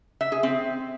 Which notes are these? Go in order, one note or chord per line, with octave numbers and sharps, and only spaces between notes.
E5
G#4
C4